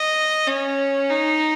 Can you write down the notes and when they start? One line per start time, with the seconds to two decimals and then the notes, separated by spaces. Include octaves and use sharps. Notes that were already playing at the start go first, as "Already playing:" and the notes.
Already playing: D#5
0.47 C#4
1.10 D#4